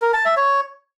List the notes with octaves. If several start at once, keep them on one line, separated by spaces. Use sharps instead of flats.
A#4
A5
E5
C#5